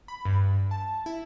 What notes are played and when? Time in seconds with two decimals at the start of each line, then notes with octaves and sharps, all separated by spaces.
0.08 B5
0.25 G2
0.71 A5
1.06 E4